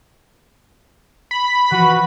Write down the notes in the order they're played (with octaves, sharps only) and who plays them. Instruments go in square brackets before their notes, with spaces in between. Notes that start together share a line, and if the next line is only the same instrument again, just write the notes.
[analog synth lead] B5
[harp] E3 F3 [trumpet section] F#4 B4